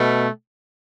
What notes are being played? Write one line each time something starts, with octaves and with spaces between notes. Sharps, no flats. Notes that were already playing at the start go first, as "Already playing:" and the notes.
Already playing: B2 A3